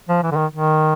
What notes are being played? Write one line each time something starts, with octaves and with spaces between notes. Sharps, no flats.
F3
E3
D3
D#3
D#3